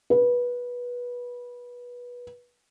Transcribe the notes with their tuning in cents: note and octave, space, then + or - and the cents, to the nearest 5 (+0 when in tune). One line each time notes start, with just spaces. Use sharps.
B4 -20